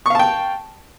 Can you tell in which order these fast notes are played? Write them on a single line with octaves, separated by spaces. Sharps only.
C#6 F5 A5 G5